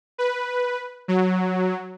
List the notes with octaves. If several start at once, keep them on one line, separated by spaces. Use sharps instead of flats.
B4
F#3